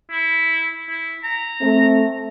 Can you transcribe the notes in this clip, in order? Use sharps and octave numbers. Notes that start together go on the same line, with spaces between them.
E4
E4
A#5
A3 C4